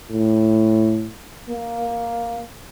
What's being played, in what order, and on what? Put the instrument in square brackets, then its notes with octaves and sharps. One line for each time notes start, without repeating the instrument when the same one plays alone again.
[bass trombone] A2
A#3